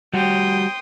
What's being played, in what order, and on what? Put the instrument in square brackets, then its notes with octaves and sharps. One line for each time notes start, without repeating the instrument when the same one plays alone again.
[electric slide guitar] G3 F#4 [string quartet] G5 C6 D#6